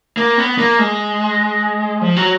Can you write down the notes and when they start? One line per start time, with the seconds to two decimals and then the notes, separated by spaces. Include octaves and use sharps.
0.17 A#3
0.37 B3
0.58 A#3
0.79 G#3
2.01 F3
2.16 F#3